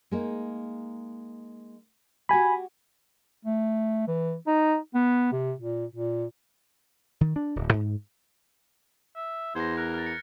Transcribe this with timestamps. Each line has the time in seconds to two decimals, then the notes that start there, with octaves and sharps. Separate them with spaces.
0.11 G#3 A#3 D#4
2.29 F#4 G4 G#5 B5
3.45 A3
4.08 E3
4.47 D#4
4.94 B3
5.32 C3
5.59 A#2
5.92 A#2
7.21 D#3
7.36 D4
7.56 D1
7.74 G#2
9.16 E5
9.55 E2 C5 G#6 A#6
9.77 A#4 F6 F#6
9.94 F6 A6
10.06 C#7